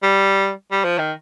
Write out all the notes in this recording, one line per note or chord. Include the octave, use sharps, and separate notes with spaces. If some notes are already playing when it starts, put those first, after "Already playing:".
G3
G3
F3
D#3